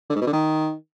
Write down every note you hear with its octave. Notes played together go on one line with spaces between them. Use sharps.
D3
G#2
B2
D3
D#3